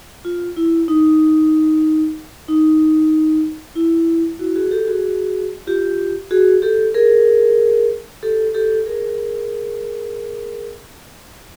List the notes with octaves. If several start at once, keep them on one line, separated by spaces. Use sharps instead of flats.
F4
E4
D#4
D#4
E4
E4 F#4
F#4 G#4
G4 A4
F#4 G#4
F4 G4
F#4 G#4
G4 A4
G#4 A#4
G4 A4
G4 A4
G#4 A#4